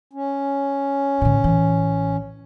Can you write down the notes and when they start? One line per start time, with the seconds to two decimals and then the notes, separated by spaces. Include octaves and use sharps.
0.13 C#4
1.21 A2 D3
1.44 A1 E3